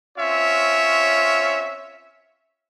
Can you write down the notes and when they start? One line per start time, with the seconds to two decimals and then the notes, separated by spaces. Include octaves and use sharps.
0.18 C4 C#4 F4 C#5 E5